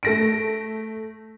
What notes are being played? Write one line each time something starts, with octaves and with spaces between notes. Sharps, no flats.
A3 A#6 D7